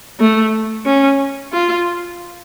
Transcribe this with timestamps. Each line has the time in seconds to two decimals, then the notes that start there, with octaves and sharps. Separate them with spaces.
0.20 A3
0.86 C#4
1.52 F4